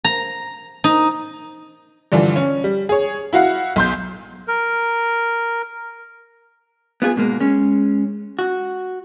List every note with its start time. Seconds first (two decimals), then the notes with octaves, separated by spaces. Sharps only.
0.05 A#5
0.84 D#4
2.12 G2 D3 E3 F3
2.36 C#4
2.64 G3
2.89 G#4 C#5
3.33 E4 F#4 F5 F#5
3.76 B1 C6 G6
4.48 A#4
7.02 B3 F4 F#4 G#4
7.16 G#2 B2 G#3 A#3
7.40 G#3 C#4
8.39 F#4